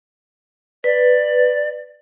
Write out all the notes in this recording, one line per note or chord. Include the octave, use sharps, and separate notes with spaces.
B4 D5